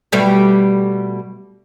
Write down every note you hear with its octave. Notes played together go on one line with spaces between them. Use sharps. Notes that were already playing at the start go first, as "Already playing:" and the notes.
B2 G3 A3